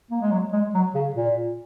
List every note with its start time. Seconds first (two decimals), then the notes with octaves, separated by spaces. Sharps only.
0.11 A#3
0.21 G#3
0.31 F#3
0.53 G#3
0.74 F#3
0.95 C#3
1.16 A#2